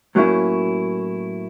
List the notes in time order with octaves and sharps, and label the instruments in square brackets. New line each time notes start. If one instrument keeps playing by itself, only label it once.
[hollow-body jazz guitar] A2 F#3 A#3 C#4 E4